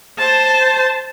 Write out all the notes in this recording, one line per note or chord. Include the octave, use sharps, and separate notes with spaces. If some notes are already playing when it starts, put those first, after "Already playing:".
C5 A5